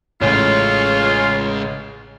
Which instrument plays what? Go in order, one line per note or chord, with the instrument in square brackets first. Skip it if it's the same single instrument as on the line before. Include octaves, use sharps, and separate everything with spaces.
[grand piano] A1 [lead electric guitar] C#3 G#3 [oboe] F4 [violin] C#5